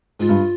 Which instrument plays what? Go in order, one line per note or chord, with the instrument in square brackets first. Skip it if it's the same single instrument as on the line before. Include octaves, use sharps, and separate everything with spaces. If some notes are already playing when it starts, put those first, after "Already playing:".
[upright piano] G#2 [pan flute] F4
[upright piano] G2